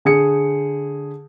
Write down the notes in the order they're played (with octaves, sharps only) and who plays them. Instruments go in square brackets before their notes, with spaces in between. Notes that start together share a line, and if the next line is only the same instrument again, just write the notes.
[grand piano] D3 G#4 C#7